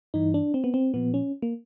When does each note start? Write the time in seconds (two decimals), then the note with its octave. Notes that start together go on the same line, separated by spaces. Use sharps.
0.14 G2 E3 D#4
0.34 D4
0.54 C4
0.64 B3
0.74 C4
0.94 A#2 F3 B3
1.14 C#4
1.42 A#3